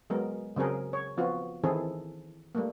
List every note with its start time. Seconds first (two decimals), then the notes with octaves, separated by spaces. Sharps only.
0.10 F#3 G#3 B3 A#4
0.56 C#3 F#3 C4 G#4 A#4
0.93 C#5
1.17 F3 B3 C4 F4 F#4
1.64 D#3 E3 C4 E4 G#4 A4
2.55 G3 A3 A#3